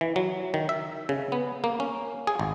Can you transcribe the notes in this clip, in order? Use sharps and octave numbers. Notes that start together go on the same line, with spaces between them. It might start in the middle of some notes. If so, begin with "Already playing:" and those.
E3
F#3
D#3
E5
C#3
B3
A#3
C#4
G#4
G#1